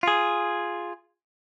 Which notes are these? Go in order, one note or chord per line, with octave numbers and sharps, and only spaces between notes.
F4 G#4